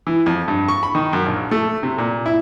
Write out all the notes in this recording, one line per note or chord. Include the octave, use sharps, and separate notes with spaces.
E3
F2
G2
C#6
B5
D#3
F#2
A#1
A3
C3
A#2
E4